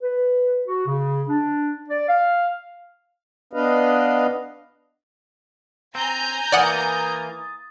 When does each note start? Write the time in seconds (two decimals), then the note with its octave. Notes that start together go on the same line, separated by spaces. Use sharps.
0.02 B4
0.67 F#4
0.87 C#3
1.29 D4
1.90 D5
2.09 F5
3.53 B3 D4 B4 D#5 F5
5.95 C4 G#5 A#5 G6
6.52 E3 A#3 D5 F#5 D#6 A6 C#7